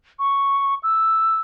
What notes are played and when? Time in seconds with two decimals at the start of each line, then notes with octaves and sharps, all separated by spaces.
0.19 C#6
0.83 E6